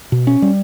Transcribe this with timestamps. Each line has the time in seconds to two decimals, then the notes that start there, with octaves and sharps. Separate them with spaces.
0.12 B2
0.27 C#4
0.42 G3